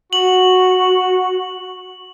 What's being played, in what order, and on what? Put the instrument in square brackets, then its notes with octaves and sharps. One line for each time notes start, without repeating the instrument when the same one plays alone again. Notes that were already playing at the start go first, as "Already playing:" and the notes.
[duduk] F#4 [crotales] F#7